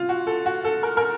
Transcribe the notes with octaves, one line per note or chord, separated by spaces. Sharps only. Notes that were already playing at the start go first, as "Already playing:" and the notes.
Already playing: C3 F4
F#4
A4
F#4
A4
A#4
A#4